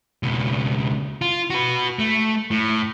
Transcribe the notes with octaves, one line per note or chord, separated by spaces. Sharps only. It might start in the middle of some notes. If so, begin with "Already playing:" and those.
C#2 B2
F4
F#4 B4
A3
A2